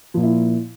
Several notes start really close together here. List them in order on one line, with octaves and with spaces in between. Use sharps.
F3 A#2 A#3 E4